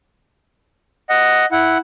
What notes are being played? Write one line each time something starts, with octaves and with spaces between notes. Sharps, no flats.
D#5 F#5
E4 F#5